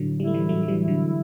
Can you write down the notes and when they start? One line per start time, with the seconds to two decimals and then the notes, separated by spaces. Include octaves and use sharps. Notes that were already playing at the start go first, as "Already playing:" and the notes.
Already playing: A2 D3 F#3
0.20 G3 E4
0.27 A3
0.34 E3 G3
0.49 A2 F#3 A3
0.63 F#3
0.68 E3 G3
0.78 E4
0.88 D3 F#3